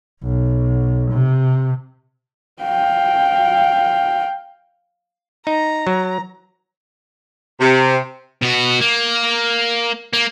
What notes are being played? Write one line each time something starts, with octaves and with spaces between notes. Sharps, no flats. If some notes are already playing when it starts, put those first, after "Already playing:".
B1
C3
F5 G5
D#4 A#5
F#3
C3
B2 F#4
A#3
A#3